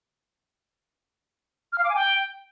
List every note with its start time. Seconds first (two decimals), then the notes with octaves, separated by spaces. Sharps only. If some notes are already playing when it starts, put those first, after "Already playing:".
1.72 F6
1.78 F5
1.84 D6
1.89 G#5
1.95 G5